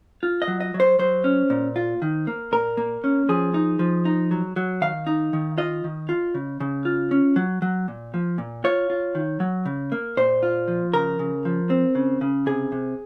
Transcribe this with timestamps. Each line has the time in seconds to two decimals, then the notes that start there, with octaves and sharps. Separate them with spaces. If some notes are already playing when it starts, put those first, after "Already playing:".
0.23 F4
0.42 D#5
0.48 F#3
0.61 D#5
0.74 F#3
0.80 C5
0.99 F#3 C5
1.24 C#4
1.50 A#2
1.76 F4
2.02 D#3
2.27 A#3
2.52 A#2 A#4
2.77 A#3
3.04 C#4
3.29 F3 G#4
3.54 D#4
3.79 F3
4.05 D#4
4.31 F#3
4.56 F#3
4.81 D#3 F5
5.07 D#4
5.33 D#3
5.58 F4 D#5
5.84 D#3
6.09 F4
6.35 C#3
6.60 C#3
6.85 F4
7.11 C#4
7.36 F#3
7.62 F#3
7.88 A#2
8.14 F3
8.38 A#2
8.64 F4 C#5
8.90 F4
9.15 D#3
9.40 F#3
9.66 C#3
9.92 A#3
10.17 A#2 C5
10.43 F4
10.68 F3
10.93 C#3 A#4
11.19 C#3
11.45 F3
11.70 C4
11.95 C#3
12.21 C#3
12.46 C3 G#4
12.72 C3